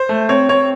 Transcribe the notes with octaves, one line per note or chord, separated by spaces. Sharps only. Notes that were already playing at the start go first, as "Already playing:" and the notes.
Already playing: C5
A3
C4 C#5
C4 C#5